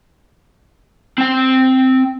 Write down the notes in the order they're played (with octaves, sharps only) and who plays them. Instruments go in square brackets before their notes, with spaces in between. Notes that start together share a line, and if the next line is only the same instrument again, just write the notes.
[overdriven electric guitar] C4 G5